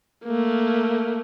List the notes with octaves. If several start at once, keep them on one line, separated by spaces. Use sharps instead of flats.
A3 A#3